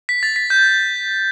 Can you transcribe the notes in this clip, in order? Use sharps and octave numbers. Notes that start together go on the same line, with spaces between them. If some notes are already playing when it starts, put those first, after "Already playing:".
B6
A6
B6
G6